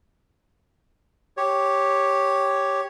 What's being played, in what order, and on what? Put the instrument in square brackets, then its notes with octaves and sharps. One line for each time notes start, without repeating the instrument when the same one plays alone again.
[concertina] G4 C#5